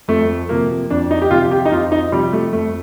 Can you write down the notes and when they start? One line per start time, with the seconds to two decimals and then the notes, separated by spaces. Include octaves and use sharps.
0.08 F2 A3
0.49 C3 F3 A#3
0.90 F2 D4
1.11 D#4
1.22 G4
1.31 C3 F3 F4
1.51 G4
1.65 D#4
1.71 F2 F4
1.92 D#4
2.12 C3 F3 G3
2.33 A3
2.53 F2 A3